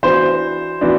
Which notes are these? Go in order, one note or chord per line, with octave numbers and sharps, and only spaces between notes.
E3 B3 D4 F#4 C5
E3 B3 D4 F#4